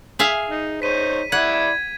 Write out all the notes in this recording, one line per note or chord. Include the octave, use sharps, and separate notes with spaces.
G#4 E5 F5
D#4
D#4 C5 C#5 B6 D#7
E4 D5 F#5 B5 G#6